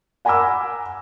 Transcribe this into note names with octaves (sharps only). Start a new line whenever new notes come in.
F#5 G#5 A#5 B5 D6 E6